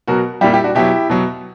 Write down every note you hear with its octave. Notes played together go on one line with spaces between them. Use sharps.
B2 F#3 F#4 A#4
A#2 G3 E4 G4
E4 G4
D4 F#4
B2 F#3 E4 G4
B2 F#3